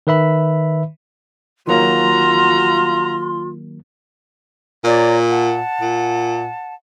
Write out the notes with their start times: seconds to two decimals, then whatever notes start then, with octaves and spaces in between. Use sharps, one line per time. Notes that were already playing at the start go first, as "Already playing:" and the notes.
0.07 D#3 B4 E5 B5
1.67 D#3 F#3 A#3 F4 F#4 A#5 C6
4.84 A#2 C#5 D5 A#5
5.31 F#5 A5
5.81 A#2